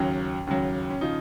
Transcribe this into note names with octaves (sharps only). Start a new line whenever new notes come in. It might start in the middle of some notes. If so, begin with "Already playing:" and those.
Already playing: D#2 C#3 F#3 C#4
D#2 C#3 F#3
C#4
C#3 F3 D#4